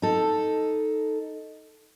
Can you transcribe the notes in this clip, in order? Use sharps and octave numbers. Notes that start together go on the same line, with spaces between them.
D#4 A4